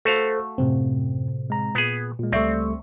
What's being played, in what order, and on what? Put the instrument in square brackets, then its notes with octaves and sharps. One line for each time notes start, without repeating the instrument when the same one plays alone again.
[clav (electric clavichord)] A3 F#4 F5 [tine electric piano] A4 C5
[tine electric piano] F#2 [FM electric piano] A2 C3 C4
[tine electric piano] G#3 A#5
[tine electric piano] A#2 [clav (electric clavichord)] B3 G#4
[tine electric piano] A#2 G#3
[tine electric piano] C#2 G3 A3 [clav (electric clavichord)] C4 [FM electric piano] D5 E5 C#6